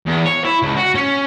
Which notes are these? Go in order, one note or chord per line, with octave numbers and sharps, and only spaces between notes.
E2
C#5
E4
C#2
F#4
C#4